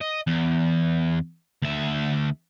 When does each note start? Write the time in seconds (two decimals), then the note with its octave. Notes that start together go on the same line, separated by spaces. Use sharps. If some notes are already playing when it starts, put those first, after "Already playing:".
0.01 D#5
0.27 E2
1.62 D2 E5